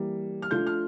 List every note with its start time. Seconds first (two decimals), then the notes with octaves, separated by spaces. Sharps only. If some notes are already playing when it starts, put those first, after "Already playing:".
Already playing: E3 G3 A#3
0.42 F6
0.51 F3 A3 D4 F4 G6
0.67 F6